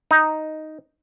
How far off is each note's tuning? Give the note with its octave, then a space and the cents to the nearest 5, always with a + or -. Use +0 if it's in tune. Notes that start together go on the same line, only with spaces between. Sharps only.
D#4 +0